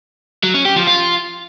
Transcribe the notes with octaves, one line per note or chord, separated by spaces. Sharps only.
F#3
C#4
G4
F3
F4